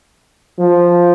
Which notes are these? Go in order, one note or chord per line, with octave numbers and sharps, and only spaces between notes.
F3